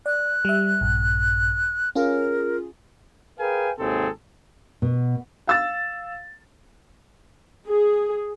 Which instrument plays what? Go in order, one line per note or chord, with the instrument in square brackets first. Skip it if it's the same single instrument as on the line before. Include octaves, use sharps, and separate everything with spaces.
[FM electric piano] D5 [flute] F#6
[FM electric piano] G3 E5
A#1 G2
[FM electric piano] C#4 F4 G#4 [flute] A#4
[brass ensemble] G#4 A#4 B4 F5 G5 G#5
G#1 D#2 C3 C4 G#4 A4
[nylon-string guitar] B2
[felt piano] F5 E6 A6
[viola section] G#4